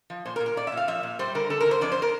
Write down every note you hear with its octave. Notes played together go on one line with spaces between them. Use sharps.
F3
A#2 C5
A#4
A#2
A#4
A#2 D5
E5
A#2
F5
F3 E5
A#2
G3 C5
D3 A#4
D3 A4
A#4
D3
C5
F2 D5
C5
A#4